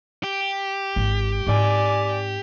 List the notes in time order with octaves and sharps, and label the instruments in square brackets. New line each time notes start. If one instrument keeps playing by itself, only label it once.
[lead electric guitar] G4
[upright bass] G#1
[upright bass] G#2 C4 [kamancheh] D5 G#5